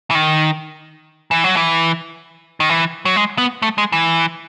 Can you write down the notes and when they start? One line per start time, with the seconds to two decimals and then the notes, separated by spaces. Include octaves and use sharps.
0.11 E3
0.15 D#3
1.31 E3
1.44 F#3
1.57 E3
2.60 D#3
2.70 E3
3.05 F#3
3.16 G#3
3.38 B3
3.62 A3
3.78 G#3
3.92 E3